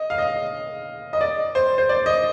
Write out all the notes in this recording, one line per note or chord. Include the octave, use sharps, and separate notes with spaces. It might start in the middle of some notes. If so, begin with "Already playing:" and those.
Already playing: D#5
F5
D#5
D#5
D5
C5
C5
D5
D#5